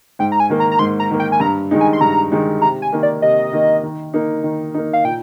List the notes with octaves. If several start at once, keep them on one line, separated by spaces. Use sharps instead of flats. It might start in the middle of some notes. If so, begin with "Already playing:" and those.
G#2 G5
A#5
G#5
D#3 A#3
A#5
A#5
G#2 C6
A#5
D#3 A#3
G5
G#5
G2 A#5
D#3 G#3 D#4
G#5
C6
G2 A#5
D#3 G#3 D#4
C3 A#5
G#5
D#3 A#3
D5
C3 D#5
D#3 A#3
D#3
A#3 D#4
D#3
A#3 D#4
F5
A#2 G5